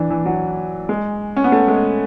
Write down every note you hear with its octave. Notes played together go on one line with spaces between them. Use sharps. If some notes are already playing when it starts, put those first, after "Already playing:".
Already playing: E3 D4
E3
F#3
G#3
C#4
B3
A3
G#3